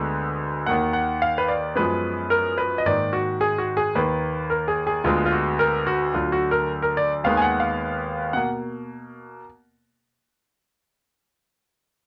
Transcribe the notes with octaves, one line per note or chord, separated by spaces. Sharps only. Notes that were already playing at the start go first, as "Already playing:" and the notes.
Already playing: D2 D3 G#3 B3
D#2 D#3 A#3 F#5
F#5
F5
B4
D5
F#2 F3 G#3 B3 B4
A#4
B4
D#5
G#2 D#3 A#3 D5
F#4
G#4
F#4
G#4
D#2 D#3 A#3 B4
A#4
G#4
G#4
D2 D3 G#3 B3 F4
F4
F#4
A#4
F#4
D2 D3 F#3 F4
F#4
A#4
A#4
D5
D#2 D#3 G#3 B3 F5
G#5
F#5
F5
B2 A#3 F#5